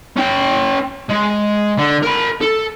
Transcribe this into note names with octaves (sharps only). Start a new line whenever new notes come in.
C#4 G5
G#3
D3
A#4 B5
A4